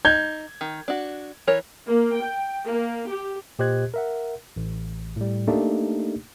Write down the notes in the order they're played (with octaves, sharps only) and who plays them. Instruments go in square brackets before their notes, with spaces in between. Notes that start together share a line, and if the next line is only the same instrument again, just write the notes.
[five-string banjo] D#4 [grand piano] G6 G#6
[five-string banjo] D#3
D4 F#4
E3 A#4 C#5
[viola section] A#3
G5
A#3
G4
[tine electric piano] A#2 G4 C5 D#5 F#6 G#6
A#4 E5 F#5
A1
A2 G3
A3 A#3 D4 D#4 G4